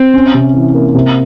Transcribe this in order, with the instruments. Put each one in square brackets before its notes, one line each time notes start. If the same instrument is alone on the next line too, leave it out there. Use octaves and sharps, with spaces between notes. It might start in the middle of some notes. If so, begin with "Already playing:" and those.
Already playing: [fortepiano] C4
[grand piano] C#4
C3
E3
A#3
C3